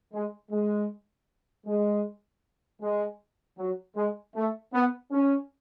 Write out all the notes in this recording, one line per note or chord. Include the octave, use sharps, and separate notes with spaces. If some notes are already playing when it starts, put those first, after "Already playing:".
G#3
G#3
G#3
G#3
F#3
G#3
A3
B3
C#4